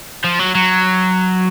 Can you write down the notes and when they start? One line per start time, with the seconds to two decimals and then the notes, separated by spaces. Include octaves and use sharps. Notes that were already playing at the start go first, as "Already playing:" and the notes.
0.24 F3
0.39 F#3
0.55 F#3